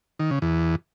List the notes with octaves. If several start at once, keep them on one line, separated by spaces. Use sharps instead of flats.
D#3
C#3
E2